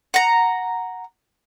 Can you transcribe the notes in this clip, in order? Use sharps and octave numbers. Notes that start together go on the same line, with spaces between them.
F#5 A#5